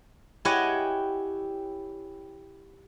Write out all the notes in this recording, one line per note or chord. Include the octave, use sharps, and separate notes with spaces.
E4 G4 C#5 D#5 F#5 G#5